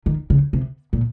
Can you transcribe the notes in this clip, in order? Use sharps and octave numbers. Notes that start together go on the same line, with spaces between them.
D#3
C#3
C3
A#2